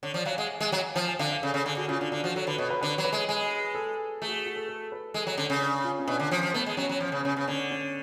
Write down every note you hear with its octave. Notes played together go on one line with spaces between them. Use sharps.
D3 C#5
F3 D5
F#3 F5
G#5
G#3 F#5
G#3
F#3 G#5
F3 A5
G#5
D3 F5
F5
C#3 A4
C#3 A4
D3 G#4
D3 F#4
C#3 F4
D3 D4
D3 D4
F3 F#4
F#3 A4
D3 B4
B2 C#5
B4
D3 B4
F#3 C#5
B4
G#3
G#3 G#4
A4
A3 G#4
F#4
G#4
F#4
A4
A4
B4
G#3 A4
F#3
D3 C#4
C#3
D4
F4
C#4
B2 D4
D3
F3 C#4
F3
A3 B3
G#3
F#3 C#4
F#3
F3 C#4
C#3
C#3
C#3
D3 C#4
C#4